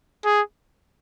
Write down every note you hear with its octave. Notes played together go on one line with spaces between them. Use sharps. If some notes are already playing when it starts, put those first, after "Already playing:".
G#4